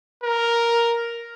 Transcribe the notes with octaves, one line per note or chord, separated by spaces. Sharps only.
A#4